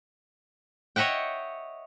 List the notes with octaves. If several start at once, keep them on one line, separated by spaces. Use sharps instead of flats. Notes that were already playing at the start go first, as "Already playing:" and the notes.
C#5 D#5 E5 F#5 G5